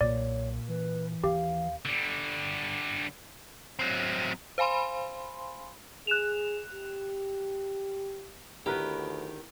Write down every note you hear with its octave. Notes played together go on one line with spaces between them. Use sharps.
B1 A#2 C#5 D5
E3 B4
D#2 G4 F5
D3 G3
F#3 C4
C5 F5 G#5 B5 C6
G#4 F#6 E7 F7
G4
D2 D#3 B3 D4 E4 G4 A#4 B4